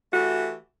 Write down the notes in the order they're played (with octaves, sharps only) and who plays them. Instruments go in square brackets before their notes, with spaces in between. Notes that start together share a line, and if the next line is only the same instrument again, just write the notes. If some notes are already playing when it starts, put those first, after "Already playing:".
[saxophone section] E3 A3 F#4 G4